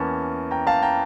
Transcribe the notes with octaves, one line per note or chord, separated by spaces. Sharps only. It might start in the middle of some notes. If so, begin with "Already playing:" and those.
Already playing: E2 E3 A#3 C#4 A5 C#6
G5 A#5
F5 A5
G5 A#5